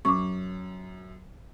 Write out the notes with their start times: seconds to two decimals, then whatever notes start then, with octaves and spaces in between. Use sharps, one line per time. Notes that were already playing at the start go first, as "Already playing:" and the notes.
0.05 F#2 C#6 D6